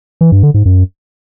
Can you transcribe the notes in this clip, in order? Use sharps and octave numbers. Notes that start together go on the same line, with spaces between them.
E3
G2
D3
G#2
F#2